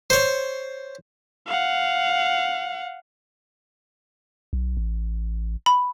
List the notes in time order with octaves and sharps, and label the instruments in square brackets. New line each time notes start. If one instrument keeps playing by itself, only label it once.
[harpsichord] C5 C#5
[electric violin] F5 F#5
[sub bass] B1
A1
[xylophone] B5